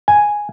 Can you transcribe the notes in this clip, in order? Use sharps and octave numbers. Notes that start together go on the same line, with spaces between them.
G#5